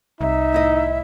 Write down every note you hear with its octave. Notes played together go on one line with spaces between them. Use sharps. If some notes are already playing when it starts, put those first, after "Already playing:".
C2 D#4 E5
A2 E4 D#5